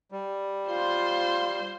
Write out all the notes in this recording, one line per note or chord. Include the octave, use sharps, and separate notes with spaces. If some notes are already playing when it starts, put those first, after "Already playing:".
G3
F4 C5 C6